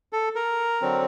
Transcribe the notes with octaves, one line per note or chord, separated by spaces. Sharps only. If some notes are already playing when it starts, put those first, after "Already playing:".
A4
A#4
D3 F#3 C4